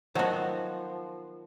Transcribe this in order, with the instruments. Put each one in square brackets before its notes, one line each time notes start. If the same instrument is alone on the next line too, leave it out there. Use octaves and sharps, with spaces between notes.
[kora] D#3 B3 [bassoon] F3 [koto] F#3 F#4 [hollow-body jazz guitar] C5 F#5 A5